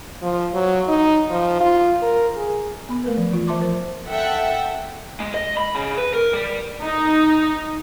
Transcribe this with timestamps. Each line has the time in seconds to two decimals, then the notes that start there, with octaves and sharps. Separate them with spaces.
0.22 F3
0.53 F#3
0.88 D#4
1.29 F3
1.60 F4
2.02 A#4
2.36 G#4
2.89 B3 B5
3.04 A3 A#4 B4
3.17 F3
3.31 E3 F4
3.47 C5 E5 A5 C6 D6
3.59 F3 A#4 C5
4.09 A4 E5 F#5 G5
5.20 G#3
5.34 D#5
5.57 B5
5.75 C#3
5.98 B4
6.14 A#4
6.33 G3
6.83 D#4